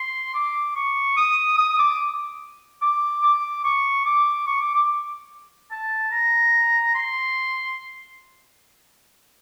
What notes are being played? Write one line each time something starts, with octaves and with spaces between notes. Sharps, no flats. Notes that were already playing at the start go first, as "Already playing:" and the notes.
Already playing: C6
D6
C#6
D#6
D#6
D6
D6
D6
C#6
D6
C#6
D6
D6
A5
A#5
C6